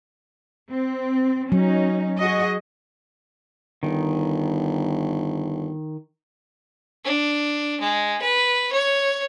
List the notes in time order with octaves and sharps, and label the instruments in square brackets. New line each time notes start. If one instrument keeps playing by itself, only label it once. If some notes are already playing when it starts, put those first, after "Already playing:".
[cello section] C4
[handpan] F#3 [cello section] C#4 D#4
[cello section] F#4 G#4 D#5
[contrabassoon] G1 [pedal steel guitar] D#3
[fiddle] D4
G#3
B4
C#5